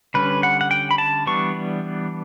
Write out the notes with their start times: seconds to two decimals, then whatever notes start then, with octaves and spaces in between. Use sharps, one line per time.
0.14 D3 G3 C#4 B4
0.43 F#5
0.61 F#5
0.71 G5
0.91 B5
0.98 A5
1.26 E3 G3 B3 D4 C#6